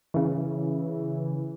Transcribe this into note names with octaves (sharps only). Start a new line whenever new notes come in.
C#3 E3